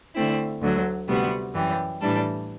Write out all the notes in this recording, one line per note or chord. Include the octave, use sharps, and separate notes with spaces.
D3 A3 C4 E4
D2 D3 F#3
D2 C3 G3 B3 F#4
F#2 E3 G3
A2 E3 G3 D4 A4